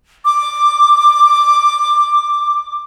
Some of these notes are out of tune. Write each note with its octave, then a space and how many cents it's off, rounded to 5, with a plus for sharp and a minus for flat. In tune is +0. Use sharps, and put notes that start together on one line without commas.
D6 +10